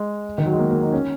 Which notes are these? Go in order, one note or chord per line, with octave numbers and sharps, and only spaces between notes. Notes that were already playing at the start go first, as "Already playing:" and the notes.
Already playing: G#3
D#3
F#3
G#3
A#3
A#3
D#4
C#4